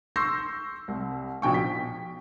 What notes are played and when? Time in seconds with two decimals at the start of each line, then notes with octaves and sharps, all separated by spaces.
0.16 C6 C#6 E6 G6 A#6 C7
0.88 C2
1.42 A#1 B2 G5 C#6
1.54 B6